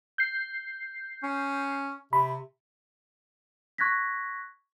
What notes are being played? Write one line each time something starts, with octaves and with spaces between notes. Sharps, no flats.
G6 C7
C#4
C3 B5
C#6 F#6 G#6 A#6 B6